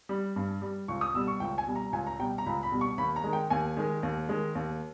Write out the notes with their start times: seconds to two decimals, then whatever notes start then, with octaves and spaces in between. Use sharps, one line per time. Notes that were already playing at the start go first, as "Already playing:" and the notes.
0.09 G3
0.36 G2
0.62 G3
0.88 C#2 C#6
1.01 D#6
1.14 B2 G3 E6
1.28 C#6
1.40 C#2 G5
1.58 G#5
1.67 B2 G3
1.75 A#5
1.93 C#2 G#5
2.07 A#5
2.19 B2 G5
2.22 G3
2.38 A#5
2.46 C#2 B5
2.63 B5
2.72 B2 G3
2.81 C#6
2.98 D#2 B5
3.16 A#5
3.24 D#3 G#3
3.33 G5
3.50 D#2 G#5
3.77 D#3 G#3
4.03 D#2
4.29 D#3 G#3
4.55 D#2